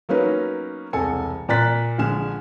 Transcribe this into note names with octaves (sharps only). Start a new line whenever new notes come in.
F#3 A#3 B3 C#4 D#4 B4
E1 C2 A4 G#5 C#7
A#2 D5 A#5 F#6 A6 B6
A#1 D3 G#3 G#5 F6 E7